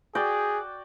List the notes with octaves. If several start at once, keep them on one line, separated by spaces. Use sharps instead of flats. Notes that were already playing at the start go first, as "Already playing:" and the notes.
F#4 G#4 D5 G5